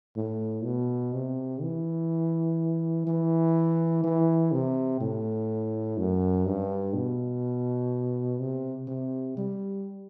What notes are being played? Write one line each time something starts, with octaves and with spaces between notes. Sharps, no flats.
A2
B2
C3
E3
E3
E3
C3
A2
F#2
G2
B2
C3
C3
G3